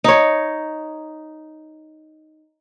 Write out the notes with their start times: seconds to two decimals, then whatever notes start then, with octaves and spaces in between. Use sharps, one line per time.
0.04 D#4 C#5